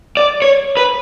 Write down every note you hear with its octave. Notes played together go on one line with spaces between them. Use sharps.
D5
C#5
B4